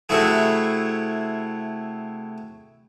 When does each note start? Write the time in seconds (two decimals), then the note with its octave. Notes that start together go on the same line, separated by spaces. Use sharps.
0.09 C3 A3 E4 F#4 G#4